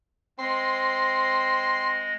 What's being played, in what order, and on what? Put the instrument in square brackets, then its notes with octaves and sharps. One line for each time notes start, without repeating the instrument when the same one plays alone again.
[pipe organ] G#3 A#6 [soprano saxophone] C4 [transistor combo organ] C6